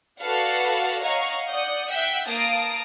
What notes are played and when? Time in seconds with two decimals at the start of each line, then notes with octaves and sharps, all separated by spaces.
0.19 F#4 A4 B4 D5 F5 F#5
1.02 C#5 D#5 F5 F#5 A#5 C#6
1.49 D5 F#5 D#6 G6 C#7
1.90 E5 F#5 G5 F#6 G6
2.28 A#3 F5 A5 A#5 D#6 D7